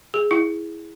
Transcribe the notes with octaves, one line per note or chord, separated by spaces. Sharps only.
G#4
E4